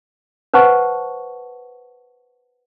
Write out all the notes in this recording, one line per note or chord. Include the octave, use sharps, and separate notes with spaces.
B4 C5 F#5 A5 C#6